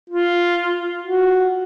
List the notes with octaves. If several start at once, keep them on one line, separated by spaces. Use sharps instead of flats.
F4
F#4